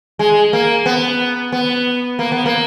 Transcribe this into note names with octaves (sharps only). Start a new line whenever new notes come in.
G#3
A#3
B3
B3
A#3
B3
A#3